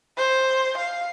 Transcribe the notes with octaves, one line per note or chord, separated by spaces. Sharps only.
C5
F5